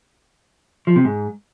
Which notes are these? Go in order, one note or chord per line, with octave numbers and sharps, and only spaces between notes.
F3
C3
G#2